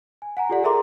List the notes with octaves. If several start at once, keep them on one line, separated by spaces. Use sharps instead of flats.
G#5
F#5 G#5 A#5
F4 G4 A4 D5 F#5
G#4 A#4 E5 A#5 C6 D6